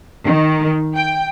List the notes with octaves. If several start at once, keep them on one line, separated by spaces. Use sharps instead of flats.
D#3
G5